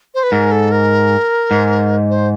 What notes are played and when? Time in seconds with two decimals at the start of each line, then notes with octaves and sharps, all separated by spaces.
0.15 C5
0.23 B4
0.32 G#2 A#4
0.52 A4
0.72 A#4
1.51 G#2
2.10 C5